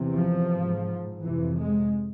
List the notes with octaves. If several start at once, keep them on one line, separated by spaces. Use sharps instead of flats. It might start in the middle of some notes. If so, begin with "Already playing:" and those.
Already playing: E2 C3
F3
G#2
F2 C3 E3
G#3